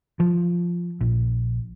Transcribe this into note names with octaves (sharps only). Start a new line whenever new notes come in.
F3
A#1